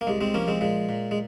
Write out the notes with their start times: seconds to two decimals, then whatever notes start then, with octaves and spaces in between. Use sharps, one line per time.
0.01 A#3
0.07 C2 G#3
0.21 G#3 C4
0.34 F3 A#3 C#4
0.48 G#3 C4
0.61 A#2 G#3
0.89 A#2
1.11 G#3